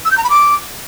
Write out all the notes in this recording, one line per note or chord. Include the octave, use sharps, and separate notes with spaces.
E6
G6
A#5
B5
D6